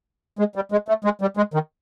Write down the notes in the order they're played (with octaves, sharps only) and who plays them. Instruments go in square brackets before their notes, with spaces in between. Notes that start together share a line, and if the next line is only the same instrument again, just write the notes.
[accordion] G#3
G3
G#3
A3
G#3
G3
G#3
D#3